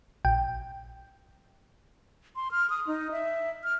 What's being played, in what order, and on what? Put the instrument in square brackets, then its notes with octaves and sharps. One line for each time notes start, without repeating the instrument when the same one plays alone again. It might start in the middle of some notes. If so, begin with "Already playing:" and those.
[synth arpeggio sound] A#1 G5
[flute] C6
F6
D#6
D#4
E5
F6